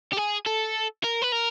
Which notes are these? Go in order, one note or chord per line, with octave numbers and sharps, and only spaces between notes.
G4
G#4
A4
A#4
B4
A#4